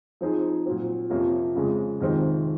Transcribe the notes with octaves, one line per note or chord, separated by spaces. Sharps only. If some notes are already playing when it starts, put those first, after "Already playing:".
F3 C4 D#4 G#4
A#2 F#3 C4
F2 C3 F3 A#3 C#4
F2 C#3 G#3
F2 C3 D#3 G#3 C4